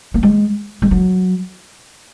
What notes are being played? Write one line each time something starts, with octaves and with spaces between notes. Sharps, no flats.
A#3
G#3
G#3
F#3